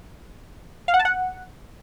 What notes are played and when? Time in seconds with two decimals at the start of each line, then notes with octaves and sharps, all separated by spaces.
0.88 F5
0.94 F#5
0.99 A5
1.05 F#5